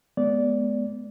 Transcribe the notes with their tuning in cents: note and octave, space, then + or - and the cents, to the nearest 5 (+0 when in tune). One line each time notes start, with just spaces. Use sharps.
G#3 +35 B3 +0 D5 -15